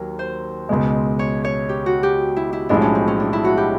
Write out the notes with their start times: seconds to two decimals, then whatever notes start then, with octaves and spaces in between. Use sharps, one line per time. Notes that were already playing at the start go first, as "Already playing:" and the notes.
Already playing: D#2 F#3 A#4
0.19 C5
0.69 C#2 B2 G#3
1.19 C#5
1.45 C#5
1.69 G4
1.86 F#4
2.03 G4
2.36 E4
2.53 E4
2.69 B1 A2 F3 G#3 D4
2.82 C#4
2.95 C4
3.08 C#4
3.20 D4
3.33 E4
3.45 F#4
3.57 G4